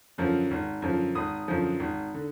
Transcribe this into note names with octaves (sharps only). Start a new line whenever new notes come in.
F#2 D3 F3
G#1
F#2 D3 F3
G#1 D#6
F#2 D3 F3
G#1
D3